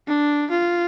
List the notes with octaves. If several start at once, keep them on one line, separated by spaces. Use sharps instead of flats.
D4
F4